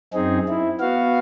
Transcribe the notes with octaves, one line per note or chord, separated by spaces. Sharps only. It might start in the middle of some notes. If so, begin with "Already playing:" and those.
F#2 C4 D#4 G#4
E4
B3 F#4 F5